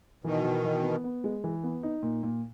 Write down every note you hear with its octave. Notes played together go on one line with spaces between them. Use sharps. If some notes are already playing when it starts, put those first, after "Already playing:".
B2 D#3 E3
E3
E3
B3
B3
G#3
E3
B3
D#4
A#2
A#2